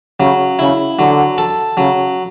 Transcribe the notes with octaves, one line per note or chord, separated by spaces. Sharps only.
C#3 F#3
C#3 E4
D3 F#3
A4
C#3 F#3